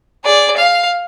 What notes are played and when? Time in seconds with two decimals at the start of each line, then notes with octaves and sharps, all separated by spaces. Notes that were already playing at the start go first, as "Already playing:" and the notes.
0.24 G#4 D5
0.57 F5